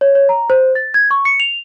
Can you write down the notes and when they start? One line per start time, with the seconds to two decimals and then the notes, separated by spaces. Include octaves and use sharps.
0.01 C#5
0.15 C#5
0.29 A#5
0.50 C5
0.75 A6
0.94 G#6
1.11 C#6
1.25 C#7
1.40 F7